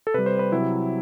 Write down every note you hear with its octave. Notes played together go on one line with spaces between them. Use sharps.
A4
C3 G3 B4
C5
B4
C3 F#3 E4